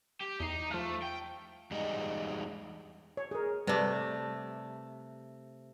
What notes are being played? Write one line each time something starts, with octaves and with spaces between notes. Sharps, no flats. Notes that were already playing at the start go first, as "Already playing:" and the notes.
G4
E2 D#4 C7
F3 A3 F5
G5
E2 G3 G#3 D#4
C#5
G#4 A#4
C3 G3 A3 B4 D5